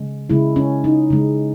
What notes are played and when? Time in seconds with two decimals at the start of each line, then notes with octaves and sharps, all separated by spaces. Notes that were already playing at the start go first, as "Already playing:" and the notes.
Already playing: C#3 G#3
0.30 C#3 G#3 E4
0.56 C#4
0.84 D#4
1.10 C#3 G#3